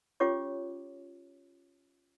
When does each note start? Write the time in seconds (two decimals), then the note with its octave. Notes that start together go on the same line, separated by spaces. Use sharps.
0.20 C#4 F4 G4 C#5 D6